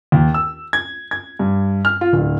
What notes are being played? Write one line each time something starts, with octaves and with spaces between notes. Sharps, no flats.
D#2
E6
G#6
G#6
G2
F6
F4
D1